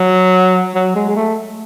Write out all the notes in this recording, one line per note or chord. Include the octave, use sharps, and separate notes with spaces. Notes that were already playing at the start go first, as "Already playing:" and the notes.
Already playing: F#3
F#3
G#3
G#3
A3